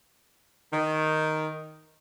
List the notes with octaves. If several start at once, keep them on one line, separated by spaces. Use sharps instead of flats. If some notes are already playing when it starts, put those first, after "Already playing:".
D#3